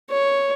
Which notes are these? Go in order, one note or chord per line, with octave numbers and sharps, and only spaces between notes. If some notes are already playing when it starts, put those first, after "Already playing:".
C#5